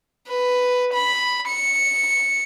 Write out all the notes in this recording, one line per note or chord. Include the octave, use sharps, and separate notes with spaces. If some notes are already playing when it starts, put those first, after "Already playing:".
B4
B5
C#7